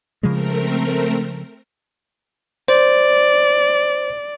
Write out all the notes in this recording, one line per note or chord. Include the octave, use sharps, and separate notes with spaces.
C#3 F3 G#3 A3 C4 A#4
C5 D5